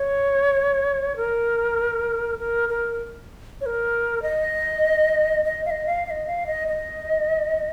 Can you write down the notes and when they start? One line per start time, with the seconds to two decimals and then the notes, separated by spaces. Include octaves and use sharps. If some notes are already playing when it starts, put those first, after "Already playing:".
Already playing: C#5
1.16 A#4
2.39 A#4
2.69 A#4
3.61 C#5
3.66 A#4
4.22 D#5
5.45 D#5
5.66 F5
5.70 D#5
5.86 F5
6.06 F5
6.10 D#5
6.27 F5
6.47 D#5
6.68 D#5